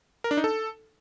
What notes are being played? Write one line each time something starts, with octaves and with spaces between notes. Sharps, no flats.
A#4
D4
D#4
A4